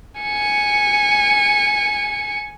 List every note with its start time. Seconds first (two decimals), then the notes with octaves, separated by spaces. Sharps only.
0.21 G#5 C#7